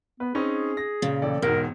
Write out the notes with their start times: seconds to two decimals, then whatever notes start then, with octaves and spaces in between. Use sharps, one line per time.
0.20 B3 B4
0.35 C4 C#4 D#4 G#4
0.77 A#6
1.02 A#2 C#3
1.22 A1 A4 D5
1.42 E1 G#2 B2 A#4